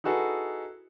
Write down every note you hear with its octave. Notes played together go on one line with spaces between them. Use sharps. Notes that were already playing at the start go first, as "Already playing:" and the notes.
D#4 E4 F#4 G#4 A4 B4